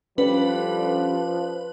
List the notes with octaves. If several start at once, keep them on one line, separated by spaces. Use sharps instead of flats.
D3 F3 G3 C#4 B4